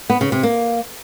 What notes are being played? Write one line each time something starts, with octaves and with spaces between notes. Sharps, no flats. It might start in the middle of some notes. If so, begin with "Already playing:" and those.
B3
C#3
C3
A#3